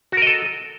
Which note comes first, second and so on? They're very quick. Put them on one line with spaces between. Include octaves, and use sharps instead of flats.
F#4 A#4 D#5 A4